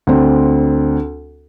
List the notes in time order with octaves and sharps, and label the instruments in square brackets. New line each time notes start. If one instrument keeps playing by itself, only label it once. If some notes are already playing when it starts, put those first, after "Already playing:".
[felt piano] D2 C4